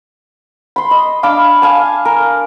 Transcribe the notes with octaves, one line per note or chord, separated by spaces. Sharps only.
B5 C6
D#5
D4 F5 B5 D6
F5 G#5 A5
A#4